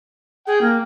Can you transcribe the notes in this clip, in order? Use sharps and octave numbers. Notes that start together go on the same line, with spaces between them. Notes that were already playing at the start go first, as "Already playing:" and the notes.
G#4 G5
A#3